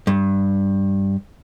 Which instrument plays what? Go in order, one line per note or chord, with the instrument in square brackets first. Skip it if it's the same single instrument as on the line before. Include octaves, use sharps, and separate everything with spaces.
[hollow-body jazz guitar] G2